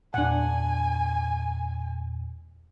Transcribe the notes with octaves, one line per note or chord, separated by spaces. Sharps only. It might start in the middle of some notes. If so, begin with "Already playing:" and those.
E2 A#2 D4 F#5 G#5